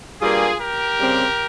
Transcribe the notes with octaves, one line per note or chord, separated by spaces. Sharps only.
G2 G3 A#3 F4 G#4
G4 A#4
C#3 G3 C4